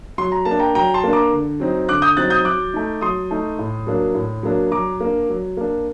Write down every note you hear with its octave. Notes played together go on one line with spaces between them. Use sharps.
F#3 C6
A#5
A#3 A5
D4
G5 A#5
F#3 G5 A#5
A5 C6
A#3 D4
A#5 D6
D3
F#3 C4 D#4
D3 D6 F#6
D#6 G6
F#3 C4 D#4 F#6 A6
D#6 G6
F#3 D6 F#6
A3 D#4
F#3 C6 D#6
A3 D#4
A2
F#3 A#3 D4
A2
F#3 A#3 D4
F#3 A#5 D6
A#3 D4
F#3
A#3 D4